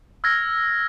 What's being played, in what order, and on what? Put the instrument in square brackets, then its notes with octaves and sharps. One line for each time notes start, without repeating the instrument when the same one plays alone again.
[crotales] E6 F6 G#6 A#6